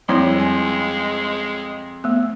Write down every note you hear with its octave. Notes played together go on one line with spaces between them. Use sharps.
F2 G3 G#3 E4 C#5
G#5
A3 B3